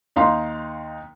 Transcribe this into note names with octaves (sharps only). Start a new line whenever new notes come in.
D#2 D#4 F5 A#5 C6